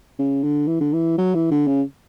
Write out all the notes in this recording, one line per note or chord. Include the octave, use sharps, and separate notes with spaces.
C#3
D3
E3
D3
E3
F#3
E3
D3
C#3